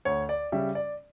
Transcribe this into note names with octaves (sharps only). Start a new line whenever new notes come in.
D2 C#5
D5
C#3 G3 C#4 E5
D5